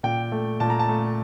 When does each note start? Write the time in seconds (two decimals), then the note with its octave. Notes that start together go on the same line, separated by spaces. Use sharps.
0.03 A#2 G5
0.32 A3
0.60 A#2 A5
0.70 A#5
0.79 A5
0.89 A3